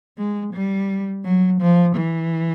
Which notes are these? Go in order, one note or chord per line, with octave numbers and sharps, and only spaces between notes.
G#3
G3
F#3
F3
E3